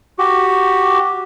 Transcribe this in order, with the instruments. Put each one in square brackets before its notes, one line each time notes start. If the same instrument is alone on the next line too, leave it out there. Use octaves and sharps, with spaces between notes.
[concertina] F#4 G4